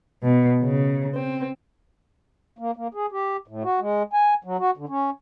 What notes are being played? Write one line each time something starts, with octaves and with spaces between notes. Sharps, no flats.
B2
C#3
C4
A#3
A#3
G#4
G4
A2
F#4
G#3
G#5
F#3
F#4
D3
C#4